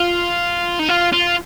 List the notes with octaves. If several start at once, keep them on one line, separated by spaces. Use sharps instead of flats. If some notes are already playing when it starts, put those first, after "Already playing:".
Already playing: F4
D#4
F4
F4